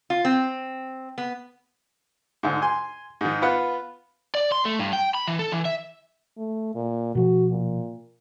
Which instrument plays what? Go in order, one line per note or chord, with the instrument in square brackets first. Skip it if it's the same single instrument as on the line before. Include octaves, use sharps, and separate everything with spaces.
[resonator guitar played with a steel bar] F4
C4
B3
[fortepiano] D2 G#2
G#5 C6
G#2 D#3
B3 F4 B4 F#5
[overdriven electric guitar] D5
C6
A3
G2
G5
B5
E3
A4
E3
E5
[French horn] A3
A#2
[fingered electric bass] B2 F3 [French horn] F#4
[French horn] A#2